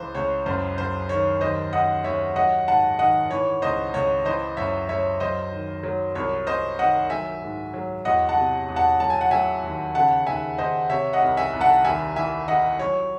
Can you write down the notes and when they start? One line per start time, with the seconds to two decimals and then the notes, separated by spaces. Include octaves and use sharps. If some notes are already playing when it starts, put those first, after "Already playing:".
Already playing: C#2 E3 C5
0.15 C#2 C#5
0.46 F#2 C5
0.77 F#2 C5
1.09 D#3 C#5
1.41 D#2 C5 D#5
1.73 D#2 D#5 F#5
2.04 D#2 C#5 E5
2.36 F#3 D#5 F#5
2.68 G#2 F#5 A5
2.99 D#3 D#5 F#5
3.31 E3 C#5
3.62 C#2 C5 D#5
3.94 C#2 C#5
4.25 E3 C5 D#5
4.57 F#2 C#5 E5
4.89 F#2 C#5 E5
5.20 F#3 C5 D#5
5.52 D#3
5.83 F#3
6.15 C2 C#5
6.47 C2 C5 D#5
6.79 D#3 D#5 F#5
7.10 F#3 E5 G#5
7.42 G#2
7.74 F#3
8.05 E2 D#5 F#5
8.29 F#5 A5
8.37 C3
8.68 E2
8.76 F#5 A5
9.00 F#3 A5
9.10 G#5
9.21 F#5
9.31 F#3 E5 G#5
9.63 D#2
9.95 C#3 F#5 A5
10.27 D#2 E5 G#5
10.58 D#2 C5 D#5
10.89 C3 C#5 E5
11.13 D#5 F#5
11.22 C2
11.37 E5 G#5
11.53 C2
11.60 F#5 A5
11.85 D#2 E5 G#5
12.16 E3 E5 G#5
12.48 E3 D#5 F#5
12.79 F#3 C#5